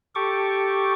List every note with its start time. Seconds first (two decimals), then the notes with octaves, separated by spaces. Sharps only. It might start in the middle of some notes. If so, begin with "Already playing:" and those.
0.15 G4 A4 C#6 D6